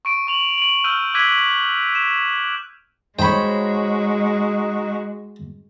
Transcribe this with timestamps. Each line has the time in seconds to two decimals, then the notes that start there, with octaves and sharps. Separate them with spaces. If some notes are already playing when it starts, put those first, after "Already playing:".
0.05 C#6 D7 D#7
0.27 C#6 F7 F#7
0.58 D#7 F#7
0.84 E6 F6 G6 D#7
1.14 D6 E6 F#6 G#6 B6 D#7
1.95 E7
3.19 G#3 D#4 F#4 C5 C#5 G5 B5